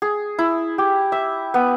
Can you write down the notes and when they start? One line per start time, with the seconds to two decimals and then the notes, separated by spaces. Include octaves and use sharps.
0.02 G#4
0.39 E4
0.78 G4
1.12 E5
1.54 B3